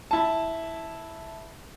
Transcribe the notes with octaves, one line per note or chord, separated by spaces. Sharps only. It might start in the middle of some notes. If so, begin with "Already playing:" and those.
E4 A5